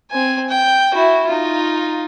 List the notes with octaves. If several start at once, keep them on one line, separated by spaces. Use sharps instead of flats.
C4 G#5
G5
E4 F#4
D#4 F4